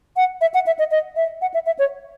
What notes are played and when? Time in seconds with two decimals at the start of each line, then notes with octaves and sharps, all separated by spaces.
0.17 F#5
0.41 E5
0.54 F#5
0.66 E5
0.79 D#5
0.91 D#5
1.16 E5
1.41 F#5
1.54 E5
1.66 E5
1.79 C#5